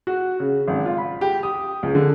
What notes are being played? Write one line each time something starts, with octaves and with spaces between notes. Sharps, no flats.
F#4
C#3
G#1
F4
B5
G4
D#6
C#2
D3